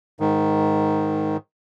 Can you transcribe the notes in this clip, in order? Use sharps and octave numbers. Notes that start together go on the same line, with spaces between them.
G#2 D#3